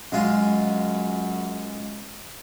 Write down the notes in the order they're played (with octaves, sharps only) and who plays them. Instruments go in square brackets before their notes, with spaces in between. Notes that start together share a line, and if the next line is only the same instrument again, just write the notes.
[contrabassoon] F#2 [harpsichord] G#3 F4